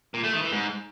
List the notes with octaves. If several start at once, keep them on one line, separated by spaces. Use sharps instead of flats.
A#2
A3
D#3
E3
G#2